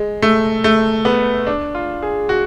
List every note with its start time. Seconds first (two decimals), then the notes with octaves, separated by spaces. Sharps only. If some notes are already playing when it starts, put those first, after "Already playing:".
Already playing: G#3
0.22 A3
0.64 A3
1.05 B3
1.47 D4
1.75 F4
2.03 G#4
2.29 F#4